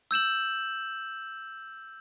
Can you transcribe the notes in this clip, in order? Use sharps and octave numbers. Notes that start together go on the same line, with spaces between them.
E6 G6 E7 F#7